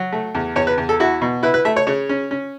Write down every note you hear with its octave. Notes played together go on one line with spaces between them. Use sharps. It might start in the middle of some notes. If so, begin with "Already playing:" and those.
Already playing: F#3
A3
E2
E2 C#5
B4
E2
A4
E4 F#4
B2
E4 B4
B4
A3 E5
C#5
C#3 C#5
C#4
C#4